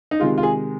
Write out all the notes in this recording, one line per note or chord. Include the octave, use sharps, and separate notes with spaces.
D#4
C3 D#3 G#3 F4
F4
G#4